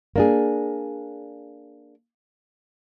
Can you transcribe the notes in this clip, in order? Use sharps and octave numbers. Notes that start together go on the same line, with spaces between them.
A#3 D4 G#4